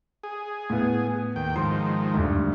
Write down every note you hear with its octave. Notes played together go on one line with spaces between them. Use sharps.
G#4
A2 B3
D#2 G5
G#2 D#3 F3 C6
D2 G2